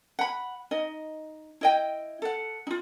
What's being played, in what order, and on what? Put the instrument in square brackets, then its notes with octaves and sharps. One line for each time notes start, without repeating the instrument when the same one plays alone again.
[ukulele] F#5 B5
D#4 D#5
E4 D#5 G5
A4 F#5
D#4 F4